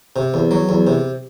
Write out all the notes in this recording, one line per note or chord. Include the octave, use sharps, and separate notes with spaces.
C3
E2
F#3
E2
C3